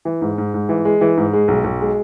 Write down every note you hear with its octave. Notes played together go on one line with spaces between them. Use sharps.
E3
G#2
G#2
G#2
E3
G#3
E3
G#2
G#3
B1
B1
G#3